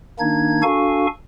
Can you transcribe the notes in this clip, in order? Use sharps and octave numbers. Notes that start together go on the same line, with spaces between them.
D#3 A#3 D4 D#4 G#6
D4 F#4 A4 F5 G#5 C#6